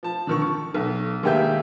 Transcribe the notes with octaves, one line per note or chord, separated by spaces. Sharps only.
F3 A5
D3 D#3 C#6
C#6
B1
D#2 G#3 A#3 G4 E5 G6